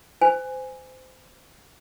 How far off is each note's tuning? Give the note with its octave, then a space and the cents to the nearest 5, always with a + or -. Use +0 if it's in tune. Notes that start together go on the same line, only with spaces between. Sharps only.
C5 -25 G#5 -5